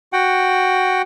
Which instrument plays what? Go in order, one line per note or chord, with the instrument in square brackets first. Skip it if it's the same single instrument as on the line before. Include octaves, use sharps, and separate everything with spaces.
[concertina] F#4 F#5 G5